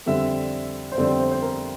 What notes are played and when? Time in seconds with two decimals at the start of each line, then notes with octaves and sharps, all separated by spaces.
0.06 F2 D3 G3 C4 E5
0.92 C5
0.97 F2 D3 G3 C4 D5
1.20 C5
1.32 C5
1.42 A#4